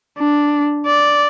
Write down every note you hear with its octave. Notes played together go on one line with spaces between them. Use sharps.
D4
D5